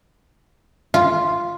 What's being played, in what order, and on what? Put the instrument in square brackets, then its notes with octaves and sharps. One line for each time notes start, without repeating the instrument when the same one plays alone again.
[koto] F4